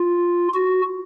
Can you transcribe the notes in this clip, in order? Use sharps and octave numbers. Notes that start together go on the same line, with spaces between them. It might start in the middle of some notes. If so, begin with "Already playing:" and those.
Already playing: F4
F#4